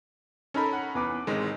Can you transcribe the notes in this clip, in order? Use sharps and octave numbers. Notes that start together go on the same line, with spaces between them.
C#4 D#4 A4 A#4 A5 B5
F#5
E2 B4 D6
A1 D#3 G#3 C4